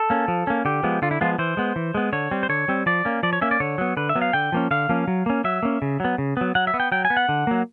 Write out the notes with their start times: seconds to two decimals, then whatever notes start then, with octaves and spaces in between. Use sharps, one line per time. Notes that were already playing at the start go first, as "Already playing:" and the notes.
Already playing: A4
0.10 A#3 C#4
0.28 F3
0.47 A#3 C#4
0.65 D3 G4
0.83 F3 G#3 B3
1.02 D3 F4
1.11 E4
1.21 F3 G#3 B3 F4
1.39 E3 C5
1.57 G#3 B3
1.76 E3
1.95 G#3 B3
2.12 D3 C#5
2.31 G3 C4
2.43 C5
2.49 D3 C#5
2.68 G3 C4
2.86 F3 D5
3.05 A#3 C#4
3.23 F3 D5
3.33 C#5
3.41 A#3 C#4 E5
3.51 D5
3.60 D3 C#5
3.78 F#3 B3
3.97 D3 B4
4.09 E5
4.15 F#3 B3
4.22 F5
4.33 D3 G5
4.52 F3 A#3 C#4
4.71 D3 F5
4.89 F3 A#3 C#4
5.08 F#3
5.26 A#3 C#4
5.44 F#3 E5
5.63 A#3 C#4
5.82 C#3
6.00 F#3 B3
6.18 C#3
6.37 F#3 B3
6.55 F#3 F#5
6.67 E5
6.74 B3
6.80 G5
6.92 F#3 G5
7.05 G#5
7.10 B3
7.17 F#5
7.29 D3
7.47 F#3 A#3